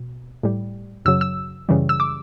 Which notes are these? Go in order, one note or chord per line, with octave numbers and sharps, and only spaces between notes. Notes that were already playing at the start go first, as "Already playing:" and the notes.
Already playing: B2
A2 G3
F#2 C#3 F#3 E6
E6
F#2 C#3 E3 G3
E6
D6